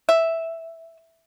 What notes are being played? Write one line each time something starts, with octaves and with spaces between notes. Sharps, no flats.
E5